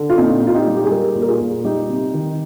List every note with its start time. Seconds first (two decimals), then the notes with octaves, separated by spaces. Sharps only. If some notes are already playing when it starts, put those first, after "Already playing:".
Already playing: D3
0.10 F4
0.17 A#2 C4 D#4
0.42 A#2 F4
0.54 D#4 G4
0.67 G3
0.77 G4
0.84 G#4
0.91 G3 G4 A#4
1.15 A#2
1.22 A#4
1.28 F4 G#4
1.41 A#2
1.64 G3 D#4 G4
1.89 C3
2.14 D#3